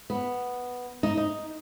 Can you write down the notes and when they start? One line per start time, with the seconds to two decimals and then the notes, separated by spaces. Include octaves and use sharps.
0.10 B3
1.03 D#4
1.17 D#4